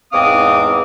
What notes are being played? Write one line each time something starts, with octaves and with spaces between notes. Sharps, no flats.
E2 G#2 C4 F5 D6 D#6